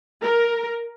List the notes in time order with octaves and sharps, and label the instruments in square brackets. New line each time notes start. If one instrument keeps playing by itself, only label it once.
[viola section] A#4